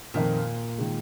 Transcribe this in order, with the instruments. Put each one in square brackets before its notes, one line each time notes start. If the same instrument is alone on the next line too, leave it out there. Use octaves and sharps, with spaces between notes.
[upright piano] F2 D#3 A#3 [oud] A#2
[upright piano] D#3 G#3